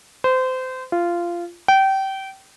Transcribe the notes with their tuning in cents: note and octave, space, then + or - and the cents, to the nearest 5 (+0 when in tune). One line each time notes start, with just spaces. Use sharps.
C5 -25
F4 -15
G5 -25